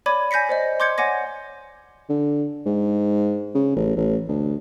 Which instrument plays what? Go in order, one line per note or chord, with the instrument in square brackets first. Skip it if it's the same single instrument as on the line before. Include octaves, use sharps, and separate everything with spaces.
[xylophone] C#5 D5 B5 D6 G#6 D#7
G#5 G6 A#6 B6 C#7
C5 D5 D#5
C6 D6 G6 G#6 C#7
C#5 F#5 G#5 D6 A#6
[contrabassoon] D3
G#2
C#3
A1
A1
D2